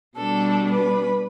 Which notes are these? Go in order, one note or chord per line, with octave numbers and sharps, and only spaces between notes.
B2 G3 D4 A4
B4